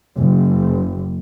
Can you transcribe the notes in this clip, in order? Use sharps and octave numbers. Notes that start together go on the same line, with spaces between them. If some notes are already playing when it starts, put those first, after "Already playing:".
F#1